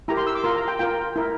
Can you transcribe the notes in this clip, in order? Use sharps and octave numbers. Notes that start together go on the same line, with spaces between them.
E4 G4 A#4 A#5
C6
E6
D6
F4 A#4 C6
A#5
G5
F4 A#4 G5
E4 A#4